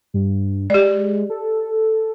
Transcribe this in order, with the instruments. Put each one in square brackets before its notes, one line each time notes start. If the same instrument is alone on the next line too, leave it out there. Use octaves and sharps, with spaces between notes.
[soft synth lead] G2
[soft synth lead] G#3 [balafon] G4 D5
[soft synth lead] A4